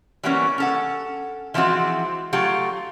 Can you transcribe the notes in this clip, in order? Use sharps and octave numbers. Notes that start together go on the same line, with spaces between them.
E3 F#3 G3 A#3 B3 C#4
C#4 A4 F#5
E3 F3 G#3 C4 F#4
F#3 A3 F4 G4